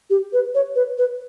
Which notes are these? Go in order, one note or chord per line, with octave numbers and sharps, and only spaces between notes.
G4
B4
C#5
B4
B4